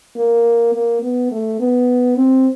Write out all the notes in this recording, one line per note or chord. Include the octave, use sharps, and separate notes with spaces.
A#3
A#3
B3
A3
B3
C4